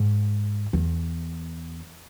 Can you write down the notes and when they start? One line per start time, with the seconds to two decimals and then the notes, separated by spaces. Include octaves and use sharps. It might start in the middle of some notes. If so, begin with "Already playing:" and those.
Already playing: G#2
0.73 E2